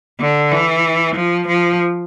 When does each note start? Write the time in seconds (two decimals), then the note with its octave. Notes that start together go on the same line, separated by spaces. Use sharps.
0.20 D3
0.51 E3
1.15 F3
1.47 F3